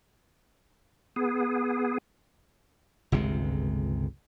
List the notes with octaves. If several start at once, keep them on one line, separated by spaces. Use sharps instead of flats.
B3 G#4
G1 C#2 C3 G#3